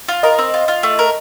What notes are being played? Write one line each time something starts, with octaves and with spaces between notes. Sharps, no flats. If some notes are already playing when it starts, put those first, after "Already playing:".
F4
A#4 D#5
C4
F4
F4
A3
A#4